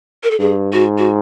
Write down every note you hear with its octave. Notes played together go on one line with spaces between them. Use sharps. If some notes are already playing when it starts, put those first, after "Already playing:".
A#4
A4
G2 G#4
G#2 F#4
F#4